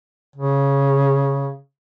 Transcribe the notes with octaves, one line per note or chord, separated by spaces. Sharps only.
C#3